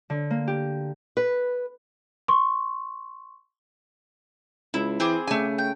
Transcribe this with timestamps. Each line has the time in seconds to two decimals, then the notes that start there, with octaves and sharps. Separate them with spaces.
0.10 D3
0.30 A#3
0.48 G4
1.17 B4
2.28 C6 C#6
4.74 C#2 E4
5.00 E3 C4 G#4 D6
5.27 C#3 A3 G#5
5.58 G5